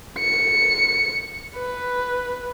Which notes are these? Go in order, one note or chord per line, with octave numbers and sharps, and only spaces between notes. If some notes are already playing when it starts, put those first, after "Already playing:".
C#7
B4